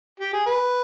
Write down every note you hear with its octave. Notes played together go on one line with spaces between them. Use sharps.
G4
G#4
B4